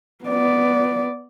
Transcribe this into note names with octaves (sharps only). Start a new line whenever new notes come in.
B3 D5